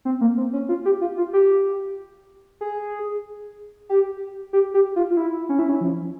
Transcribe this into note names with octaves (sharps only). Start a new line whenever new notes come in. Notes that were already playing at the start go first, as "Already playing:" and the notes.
C4
A#3
C4
C#4
F4
G4
F4
F4
G4
G#4
G4
G4
G4
F4
F4
E4
C#4
E4
C#4
F3